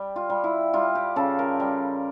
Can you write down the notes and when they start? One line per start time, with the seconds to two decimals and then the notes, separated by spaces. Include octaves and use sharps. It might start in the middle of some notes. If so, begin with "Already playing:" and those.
Already playing: G3
0.16 F4
0.30 G3
0.44 E4
0.73 G3 F4
0.95 G4
1.16 C#3 A4
1.39 A#4
1.60 G3